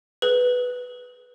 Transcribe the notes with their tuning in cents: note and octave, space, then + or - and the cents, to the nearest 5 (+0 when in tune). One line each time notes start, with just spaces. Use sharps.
G#4 +35 B4 +0